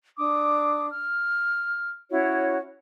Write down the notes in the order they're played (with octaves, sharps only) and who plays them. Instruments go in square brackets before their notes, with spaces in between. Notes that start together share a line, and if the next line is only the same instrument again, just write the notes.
[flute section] D4 D6 D#6
F6
C#4 E4 F#4 C#5